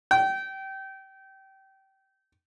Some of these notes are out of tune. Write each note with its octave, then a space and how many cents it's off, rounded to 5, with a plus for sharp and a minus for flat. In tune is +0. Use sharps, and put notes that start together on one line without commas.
G5 -25